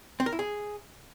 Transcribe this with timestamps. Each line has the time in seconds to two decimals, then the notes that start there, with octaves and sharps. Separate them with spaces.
0.20 C4
0.26 A#4
0.33 E4
0.39 G#4